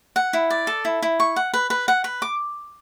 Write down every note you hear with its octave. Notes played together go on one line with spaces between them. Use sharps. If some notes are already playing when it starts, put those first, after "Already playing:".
F#5
E4
D5
A4
E4
E4
C#6
F#5
B4
B4
F#5
B4
D6